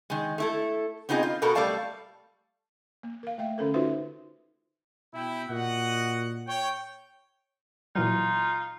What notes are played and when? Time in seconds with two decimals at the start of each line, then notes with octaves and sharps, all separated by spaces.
0.10 D#3 G#3
0.38 A3 E4 A4
1.09 B3 C4 D#4 F4 G#4 D#5
1.23 F4
1.42 B2 B3 F#4 A4 A#4
1.55 G3 A3 A4 D5 F5 A5
3.03 A#3
3.23 A#4 F5
3.38 A3 E5 G5
3.58 D3 C#4 A4 A#4
3.74 D#4 F4 F#4 B4 C5 E5
5.14 B2 E4 G5
5.49 A#2 F#4 D#5 F#5
6.47 C#5 G5
7.95 A#2 E3 F#3 D#4 F4